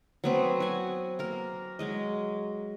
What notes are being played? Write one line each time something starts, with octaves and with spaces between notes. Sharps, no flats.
F#3 B3 C4
F#4 G#5
A#3 A#4
F#3 G#3 D#5